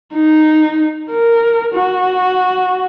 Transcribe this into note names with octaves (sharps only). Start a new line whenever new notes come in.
D#4
A#4
F#4